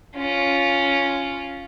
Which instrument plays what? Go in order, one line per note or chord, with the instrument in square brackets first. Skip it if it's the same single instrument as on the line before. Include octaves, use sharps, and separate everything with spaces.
[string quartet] C#4 F4